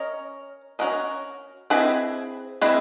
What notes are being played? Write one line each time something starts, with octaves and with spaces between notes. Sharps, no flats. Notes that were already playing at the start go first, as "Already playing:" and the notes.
Already playing: C#4 A#4 D#5
C#4 F#4 A#4 D#5
C4 E4 G#4 B4 D#5
C4 E4 G#4 B4 D#5